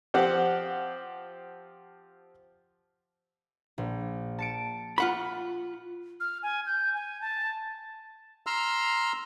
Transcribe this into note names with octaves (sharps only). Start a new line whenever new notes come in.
F3 C4 G4 F#5
A#1
A5 C#7 D7
F4 F#5 B5
F6
G#5
G6
G#5
A5
A#5 C6 E6 F6